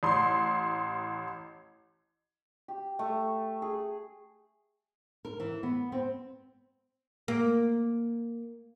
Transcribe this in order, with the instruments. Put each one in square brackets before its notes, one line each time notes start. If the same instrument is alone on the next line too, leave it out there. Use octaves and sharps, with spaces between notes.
[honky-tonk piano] A1 C6
[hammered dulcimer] G4
A3
G#4
[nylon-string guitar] A#4
E3
B3
C4
[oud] A#3